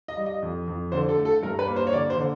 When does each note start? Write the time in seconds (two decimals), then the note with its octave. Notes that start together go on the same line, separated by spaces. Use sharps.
0.08 D#5
0.17 G3
0.26 D#5
0.42 F2
0.68 F2
0.92 D3 C5
1.09 A4
1.17 A3
1.25 A4
1.43 G2 A#4
1.59 B4
1.67 A#3
1.76 C5
1.87 C#5
1.93 D3 D5
2.10 C5
2.17 D3